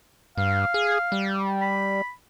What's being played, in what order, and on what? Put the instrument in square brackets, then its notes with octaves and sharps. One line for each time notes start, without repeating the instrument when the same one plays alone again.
[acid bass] G2 [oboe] F5
[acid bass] G#4
G3
[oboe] B5